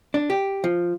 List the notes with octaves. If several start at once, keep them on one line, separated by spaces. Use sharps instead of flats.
D4
G4
F3